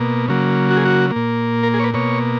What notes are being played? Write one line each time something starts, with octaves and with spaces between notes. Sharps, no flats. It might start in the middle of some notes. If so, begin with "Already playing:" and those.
Already playing: B2 A#3
C#3 F#3 A#3
F#4
G#4
F#4
A#3
A#2
A#4
G#4
C#5
B4
B2 A#3 C#5